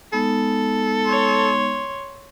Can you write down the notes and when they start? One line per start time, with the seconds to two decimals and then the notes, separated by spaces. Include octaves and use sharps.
0.13 G#3 B3 D#4 A4
1.05 C#5 C6